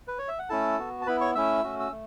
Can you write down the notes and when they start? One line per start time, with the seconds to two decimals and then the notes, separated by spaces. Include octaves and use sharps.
0.08 B4
0.18 C#5
0.28 E5
0.39 F#5
0.49 A3 C#4 E4 A4 A5
0.79 B3 F#4
1.02 A5
1.07 B3 E4 B4 B5
1.21 C#5 C#6
1.35 A3 C#4 E4 E5 E6
1.64 A3 C#4 F#4
1.80 E6
1.91 A3